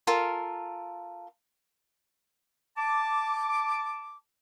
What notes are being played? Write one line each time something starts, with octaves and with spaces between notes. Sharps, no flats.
F4 A4 A#4
A5 D6